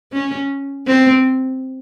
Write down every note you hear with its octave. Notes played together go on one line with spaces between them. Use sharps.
C#4
C4